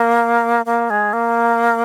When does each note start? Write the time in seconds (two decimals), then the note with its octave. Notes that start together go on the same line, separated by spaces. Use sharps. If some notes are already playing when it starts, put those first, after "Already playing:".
Already playing: A#3
0.66 A#3
0.90 G#3
1.13 A#3